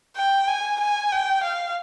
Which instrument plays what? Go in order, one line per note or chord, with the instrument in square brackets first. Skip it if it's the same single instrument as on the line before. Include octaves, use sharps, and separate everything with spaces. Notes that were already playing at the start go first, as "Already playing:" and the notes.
[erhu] G5
G#5
G#5
G5
F5